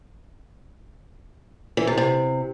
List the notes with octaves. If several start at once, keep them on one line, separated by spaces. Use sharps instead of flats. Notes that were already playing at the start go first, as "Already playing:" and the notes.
E3
C3
C3